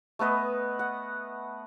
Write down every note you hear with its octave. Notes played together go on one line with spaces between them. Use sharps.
A3 B3 B4 D#5
F#5